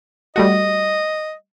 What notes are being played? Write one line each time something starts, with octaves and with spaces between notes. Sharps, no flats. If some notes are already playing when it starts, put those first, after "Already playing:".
G3 A3 F#4 D#5